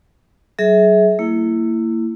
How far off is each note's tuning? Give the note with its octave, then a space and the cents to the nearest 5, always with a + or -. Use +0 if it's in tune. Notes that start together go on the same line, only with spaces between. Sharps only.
F#3 +40 G#4 +25 E5 -25
A#3 -35 E4 +10